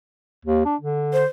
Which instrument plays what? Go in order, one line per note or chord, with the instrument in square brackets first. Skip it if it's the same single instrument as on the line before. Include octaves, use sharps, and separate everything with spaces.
[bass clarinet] D#2
D4
D3
[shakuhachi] C5